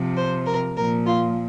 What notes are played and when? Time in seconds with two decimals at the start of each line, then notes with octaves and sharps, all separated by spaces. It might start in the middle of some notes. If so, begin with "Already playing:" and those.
Already playing: C3 F3
0.17 C5
0.47 A#4
0.77 A#2 F3 A#4
1.07 F4